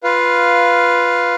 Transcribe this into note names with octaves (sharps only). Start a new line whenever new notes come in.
F4 B4 F5